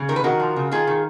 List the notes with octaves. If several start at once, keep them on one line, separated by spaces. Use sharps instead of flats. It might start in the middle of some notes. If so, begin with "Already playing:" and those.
Already playing: C#3
D#3 A#4
B4
D#3 F#4 A#4
F3
C#3
D#3 F4 G#4
D#3